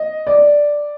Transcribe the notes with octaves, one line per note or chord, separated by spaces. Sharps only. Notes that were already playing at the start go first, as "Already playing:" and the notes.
Already playing: D#5
D5